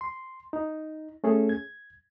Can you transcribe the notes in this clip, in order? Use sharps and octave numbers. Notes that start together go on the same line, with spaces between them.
C6
D#4
A3 C#4 G#4 A4
G#6